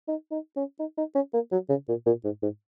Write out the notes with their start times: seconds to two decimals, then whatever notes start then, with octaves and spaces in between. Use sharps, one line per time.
0.08 D#4
0.31 D#4
0.56 C#4
0.80 D#4
0.98 D#4
1.15 C#4
1.34 A#3
1.52 F#3
1.69 C#3
1.88 A#2
2.06 A#2
2.24 G#2
2.42 G#2